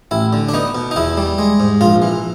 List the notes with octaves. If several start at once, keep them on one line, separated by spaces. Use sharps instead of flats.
A1 E4
D3
D4
B3 D#4
B2
D#4
E2 E4
G3
G#3
G#2
A#1 F4
E3